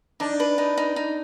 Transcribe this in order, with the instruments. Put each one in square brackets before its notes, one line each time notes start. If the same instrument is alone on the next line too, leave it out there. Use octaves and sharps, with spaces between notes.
[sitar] D4 [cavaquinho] D#4
[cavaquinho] B4
D#4
D#4
D#4